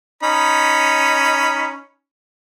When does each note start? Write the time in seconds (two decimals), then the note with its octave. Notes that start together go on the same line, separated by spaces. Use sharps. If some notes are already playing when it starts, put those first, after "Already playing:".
0.23 C#4 D#4 B5